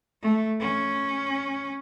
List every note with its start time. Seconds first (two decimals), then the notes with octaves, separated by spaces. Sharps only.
0.22 A3
0.60 C#4